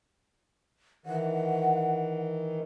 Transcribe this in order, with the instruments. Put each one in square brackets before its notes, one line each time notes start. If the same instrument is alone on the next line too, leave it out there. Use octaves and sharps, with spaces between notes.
[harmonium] D#3 E3 [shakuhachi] F#5